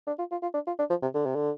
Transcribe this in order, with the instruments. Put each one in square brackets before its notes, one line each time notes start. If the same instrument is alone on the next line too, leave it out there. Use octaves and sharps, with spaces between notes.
[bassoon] D4
F4
F4
F4
D4
F4
D4
F3
C3
D3
C3
D3